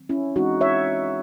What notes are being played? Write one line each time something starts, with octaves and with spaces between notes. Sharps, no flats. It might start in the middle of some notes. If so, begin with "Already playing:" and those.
Already playing: D#3 F#3 C4
C#4 E4
E3 G#3 C4 D#4 F#4
C#5 E5